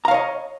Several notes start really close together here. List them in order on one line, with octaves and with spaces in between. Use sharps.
A#5 F5 C#5 D#5